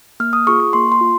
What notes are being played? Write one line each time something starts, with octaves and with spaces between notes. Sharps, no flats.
A#3 F6
D#6
F4 G#4 C#6
C#6
A#3 C6
C6
F4